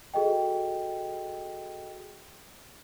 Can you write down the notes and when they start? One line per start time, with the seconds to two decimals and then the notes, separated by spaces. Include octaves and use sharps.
0.14 F#4 G#4 A4 D#5 G5